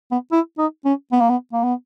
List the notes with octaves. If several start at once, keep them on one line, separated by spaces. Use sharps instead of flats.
B3
E4
D#4
C#4
B3
A#3
B3
A#3
B3